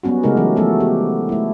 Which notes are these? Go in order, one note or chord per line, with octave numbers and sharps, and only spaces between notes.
F#3 G3 B3 C#4 F#4
C#3 G#3 A3 D#4 G4 A#4
E3 F#3 D#4
F3 F#3 A3 B3 F#4 A4
B3 G4
A3 E4